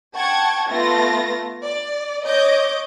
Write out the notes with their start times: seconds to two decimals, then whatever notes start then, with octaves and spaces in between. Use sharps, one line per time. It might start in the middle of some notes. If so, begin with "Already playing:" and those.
0.15 F#5 G5 A5 C#6 G#6
0.69 A3 B3 F4 A6 A#6
1.64 D5
2.25 C#5 D#5 D6 G6